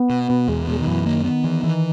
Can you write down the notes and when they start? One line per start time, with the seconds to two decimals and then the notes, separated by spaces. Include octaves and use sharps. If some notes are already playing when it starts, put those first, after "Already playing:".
Already playing: B3
0.10 B2
0.30 B2
0.48 E2 G#3
0.68 B2 G#3
0.78 D#3
0.87 F#2 E3
1.06 D#3 A#3
1.24 D#3 B3
1.44 E3
1.64 E3